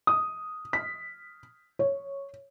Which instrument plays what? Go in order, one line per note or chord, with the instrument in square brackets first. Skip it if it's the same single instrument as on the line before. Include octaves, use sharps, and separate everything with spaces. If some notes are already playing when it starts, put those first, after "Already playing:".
[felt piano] D#6
B6
C#5